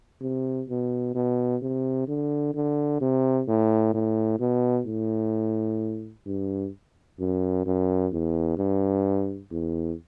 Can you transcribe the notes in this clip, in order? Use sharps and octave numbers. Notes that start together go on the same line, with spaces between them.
C3
B2
B2
C3
D3
D3
C3
A2
A2
B2
A2
G2
F#2
F#2
E2
G2
E2